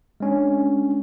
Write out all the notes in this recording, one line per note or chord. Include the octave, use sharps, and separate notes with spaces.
G#3 C#4 D4